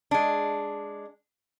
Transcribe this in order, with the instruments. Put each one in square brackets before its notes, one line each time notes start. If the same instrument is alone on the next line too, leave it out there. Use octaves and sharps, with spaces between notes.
[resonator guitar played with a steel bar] G#3 D4